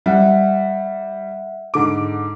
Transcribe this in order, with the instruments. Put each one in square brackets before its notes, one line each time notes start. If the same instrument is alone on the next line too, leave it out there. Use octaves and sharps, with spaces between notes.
[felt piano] G3 [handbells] E5 F#5 F#6
[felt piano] G#2 D3 D6